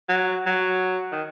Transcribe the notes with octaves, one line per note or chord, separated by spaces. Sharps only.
F#3
F#3
D#3